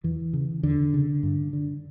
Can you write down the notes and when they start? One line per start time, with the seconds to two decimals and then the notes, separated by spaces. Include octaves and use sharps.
0.04 E2 E3
0.33 C#3
0.63 E2 D3
0.94 C#3
1.23 G2
1.53 D3